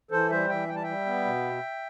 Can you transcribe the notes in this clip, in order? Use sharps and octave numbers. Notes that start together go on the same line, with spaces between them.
E3 A4 C5
G3 C5 E5
E3 E5 G5
G3 G5
A5
G3 E5 G5
B3
B2